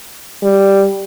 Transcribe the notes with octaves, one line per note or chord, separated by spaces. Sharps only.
G3